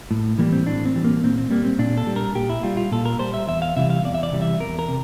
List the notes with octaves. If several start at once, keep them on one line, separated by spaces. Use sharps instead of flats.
A2
E3 G3 A#3
C4
A2 D4
C4
E3 G3
A#3
A#2 C4
C4
G3 A#3
C4
A#2 D4
A4
G3
A#4
A#2 G4
E4
G3 F4
F4
A#2 A4
A#4
G3 C5
E5
E2 E5
F5
C3 E3 G3 E5
F5
E2 D5
E5
D5
C3 E3 G3
E5
E2 A#4
A#4
C3